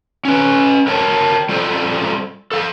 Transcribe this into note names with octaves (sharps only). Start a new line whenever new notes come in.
C#4 B4
A#4 C#5 G5 A5
G3 F4 A4 C5
A4 F5